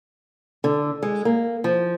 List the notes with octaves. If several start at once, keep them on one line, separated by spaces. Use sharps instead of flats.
D3
G#3
A#3
F3